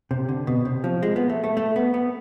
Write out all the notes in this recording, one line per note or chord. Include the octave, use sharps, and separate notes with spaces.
C3
D3
B2
C3
F3
G#3
B3
A3
A3
A3
B3
B3